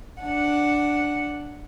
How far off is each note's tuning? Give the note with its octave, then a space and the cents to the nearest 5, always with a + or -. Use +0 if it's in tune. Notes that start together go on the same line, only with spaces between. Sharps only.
D4 +0 F#5 +0